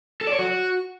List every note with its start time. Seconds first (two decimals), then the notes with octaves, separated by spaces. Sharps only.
0.21 A4
0.27 D5
0.33 C#5
0.39 F#4